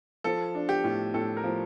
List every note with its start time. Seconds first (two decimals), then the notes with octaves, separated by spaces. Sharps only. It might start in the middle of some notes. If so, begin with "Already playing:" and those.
0.24 F3 A4
0.55 D4
0.69 G4
0.84 A2
1.14 A2 A4
1.37 A#4
1.44 F3